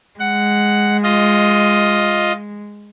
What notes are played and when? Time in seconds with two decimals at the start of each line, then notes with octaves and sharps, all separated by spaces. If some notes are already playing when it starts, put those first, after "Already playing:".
0.20 G#3 F#5
1.03 F4 D#5